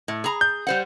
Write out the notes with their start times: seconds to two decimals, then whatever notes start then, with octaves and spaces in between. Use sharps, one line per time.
0.08 A2
0.24 G#4 A#5
0.41 G6
0.67 G3 C5 F#5